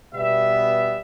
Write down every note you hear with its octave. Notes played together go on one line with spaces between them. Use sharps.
B2 G3 B3 E5